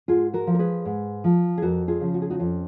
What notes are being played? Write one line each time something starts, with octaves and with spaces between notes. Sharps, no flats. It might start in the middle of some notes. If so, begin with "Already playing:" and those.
G#2 F4 G#4
F#4 A#4
F3
A#4
G#4 B4
G#2
F3
G#4
F2 F#4 A#4
F4 G#4
C#3 F3
F#4
G#4
D#4 F#4
F2 C#4 F4